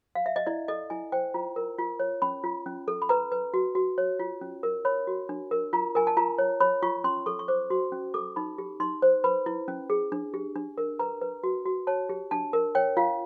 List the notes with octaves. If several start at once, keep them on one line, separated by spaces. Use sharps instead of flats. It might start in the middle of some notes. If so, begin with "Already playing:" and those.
F5
E5
D#5
E4 D5
A4 D#5
E4 G#5
C5 G5
F4 A#5
A#4
F4
C#5
C#4 B5
F4
C#4
A4
B5
B4 A#5
B4
F#4
F#4
C#5
F4
C#4
A#4
C#5 B5
F#4
D4
A#4
F4 A#5
A#4 G#5
A5
F4 A#5
C#5
C#5 B5
F4 C#6
C#4 C6
A4 C#6
C#6
C5 D6
F#4 C6
C#4
A4 D6
D#4 B5
G4
D#4 C6
C5
B4 B5
E4
C#4
G#4
D4
G4
D4
A#4
B4 A#5
B4
F#4
F#4
C#5 A5
G4
D4 A5
A#4
C#5 G5
F4 F5